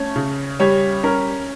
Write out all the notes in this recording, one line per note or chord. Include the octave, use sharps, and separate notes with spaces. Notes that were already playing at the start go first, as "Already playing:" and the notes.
Already playing: A3 C#4 C#5
C#3
G3 C#5
C#4 A#4